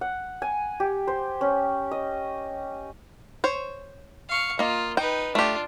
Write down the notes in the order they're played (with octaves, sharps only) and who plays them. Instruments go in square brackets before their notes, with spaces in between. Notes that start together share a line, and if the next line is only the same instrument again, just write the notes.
[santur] F#5
G#5
G4
C5
C#4
D#5
[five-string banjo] C5 C#5
[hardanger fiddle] F5 C#6
[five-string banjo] A#3 D#5 [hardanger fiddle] F4
[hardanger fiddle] D#4 B4 [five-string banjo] G5
[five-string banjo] A3 G4 [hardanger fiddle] D4 F4